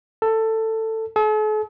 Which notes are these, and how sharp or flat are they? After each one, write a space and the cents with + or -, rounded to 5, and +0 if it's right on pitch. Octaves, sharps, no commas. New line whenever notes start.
A4 +15
A4 -45